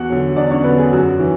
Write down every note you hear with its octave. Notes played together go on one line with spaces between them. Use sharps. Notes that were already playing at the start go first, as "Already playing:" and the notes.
Already playing: E2 F#4 F#5
D3 F#3
E2 D4 D5
C#4 C#5
D3 F#3 B3 B4
G#4
F#2 F#4
E3